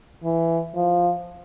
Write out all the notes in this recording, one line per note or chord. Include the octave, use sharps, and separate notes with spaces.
E3
F3